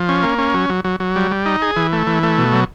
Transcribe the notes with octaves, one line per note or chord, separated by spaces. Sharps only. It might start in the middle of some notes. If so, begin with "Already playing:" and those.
Already playing: F3
C#4
A#3
C#4
F#3
F#3
F#3
F#3
G3
G3
D#4
G#4
E3
A3
E3
A3
B2
F#3